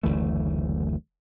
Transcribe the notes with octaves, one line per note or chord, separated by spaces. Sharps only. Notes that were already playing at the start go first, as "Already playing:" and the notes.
F#1 D2 E3 A3